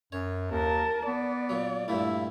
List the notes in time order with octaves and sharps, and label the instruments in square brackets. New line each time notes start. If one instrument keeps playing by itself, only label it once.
[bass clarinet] F#2 [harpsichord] C#5
[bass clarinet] D#2 [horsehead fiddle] A#4 A5
[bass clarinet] B3 [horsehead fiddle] D5
[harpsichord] A#2 F#3
[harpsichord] G2 A#2 A3 [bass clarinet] E4